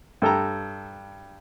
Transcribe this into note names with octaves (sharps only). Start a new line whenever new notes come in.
G2 A4 G5 A#5